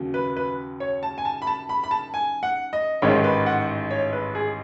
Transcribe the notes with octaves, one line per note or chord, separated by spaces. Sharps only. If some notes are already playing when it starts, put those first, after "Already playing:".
Already playing: D#2 C#3 F#3
B4
B4
C#5
A5
G#5
A5
B5
A5
B5
B5
A5
G#5
F#5
D#5
A1 G#2 D#3 G#3 C#5
B4
F#5
C#5
B4
G#4